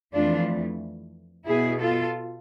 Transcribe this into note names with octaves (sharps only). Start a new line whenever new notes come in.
F2 E3 A3 D4 F4
B2 B3 E4 G#4
F4 A4